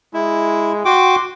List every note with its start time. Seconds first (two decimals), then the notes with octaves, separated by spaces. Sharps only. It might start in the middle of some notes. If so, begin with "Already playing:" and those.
0.14 G#3 E4
0.85 F#4 G5 C6 D6